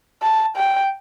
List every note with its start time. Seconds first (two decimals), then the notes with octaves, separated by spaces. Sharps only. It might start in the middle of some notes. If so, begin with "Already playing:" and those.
0.22 A5
0.57 G5